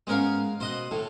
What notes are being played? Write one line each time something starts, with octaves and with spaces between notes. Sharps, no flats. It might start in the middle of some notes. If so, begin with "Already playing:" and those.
G#2 G#3 B3 C#4 A#4 F5
B2 C5 D#5 F#5
A2 A4